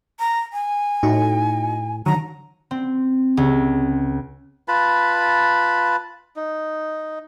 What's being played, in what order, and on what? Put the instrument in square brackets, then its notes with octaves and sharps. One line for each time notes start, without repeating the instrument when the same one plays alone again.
[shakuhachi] A#5
G#5
[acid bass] A2 [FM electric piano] D#4 F#4
[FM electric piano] D3 D#3 [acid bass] F#3 [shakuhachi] A#5
[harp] C4
C#2
[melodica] F4 B4 A5 B5
D#4